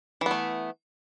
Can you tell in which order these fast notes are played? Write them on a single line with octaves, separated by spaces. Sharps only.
E3 B3 A3